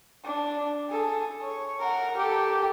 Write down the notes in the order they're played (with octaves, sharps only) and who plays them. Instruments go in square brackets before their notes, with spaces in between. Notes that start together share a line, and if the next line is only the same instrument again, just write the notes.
[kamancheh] D4
G#4 A4
C#5
A#4 F#5
G4 A4